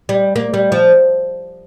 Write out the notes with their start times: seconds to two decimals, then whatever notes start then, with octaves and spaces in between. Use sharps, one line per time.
0.09 G3
0.36 A#3
0.54 G3
0.72 F3